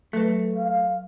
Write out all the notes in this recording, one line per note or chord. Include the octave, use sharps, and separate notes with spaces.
F#3 A3 B4
F5